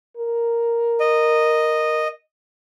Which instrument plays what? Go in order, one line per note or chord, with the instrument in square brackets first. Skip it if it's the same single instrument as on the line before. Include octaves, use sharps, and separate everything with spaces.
[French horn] A#4
[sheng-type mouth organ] D#5